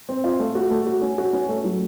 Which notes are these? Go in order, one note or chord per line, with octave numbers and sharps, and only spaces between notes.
C4
F4
A3
F#4
A3
F#4
C#4
F#4
C#4
A3
F#3